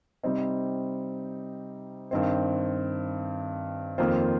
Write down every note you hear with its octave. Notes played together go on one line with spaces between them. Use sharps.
C3 G3 C4 D#4 C5
G2 D#3 C4 D#4 C5
F2 D#3 A#3 F4 C5